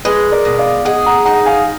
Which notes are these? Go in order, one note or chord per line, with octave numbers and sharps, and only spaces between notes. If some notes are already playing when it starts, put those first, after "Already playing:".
G#3 G#4 B4
A#4 D5
B2
D5 F5
G#4 D#5 F#5
F#5 A#5
D#4 F#5 A#5
F5 G#5